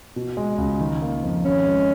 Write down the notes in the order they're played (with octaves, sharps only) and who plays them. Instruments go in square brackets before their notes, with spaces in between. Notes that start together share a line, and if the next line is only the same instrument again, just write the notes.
[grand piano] B2
G#3
C#2
D#3
A#3
F2
[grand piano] D#3 [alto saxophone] C#4
[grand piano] G#3